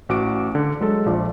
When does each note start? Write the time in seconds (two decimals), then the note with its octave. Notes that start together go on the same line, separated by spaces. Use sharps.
0.09 A1 F#4 D6 D7
0.55 D3
0.80 F#3 G#3 A4 A5
1.06 A#1 F3 D5 F5